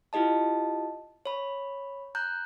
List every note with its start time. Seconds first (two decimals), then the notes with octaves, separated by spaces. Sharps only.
0.13 E4 F4 G4 D#5 A5
1.26 C#5 B5
2.15 A#5 F#6 G6